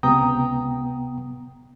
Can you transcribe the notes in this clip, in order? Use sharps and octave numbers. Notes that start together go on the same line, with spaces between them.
C#2 C3 B3 G5 A#5 D#6